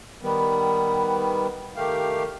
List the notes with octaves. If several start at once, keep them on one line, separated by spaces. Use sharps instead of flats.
D#3 G3 B3
D#3 A3 G4 F5